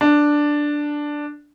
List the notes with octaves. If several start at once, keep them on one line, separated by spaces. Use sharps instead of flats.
D4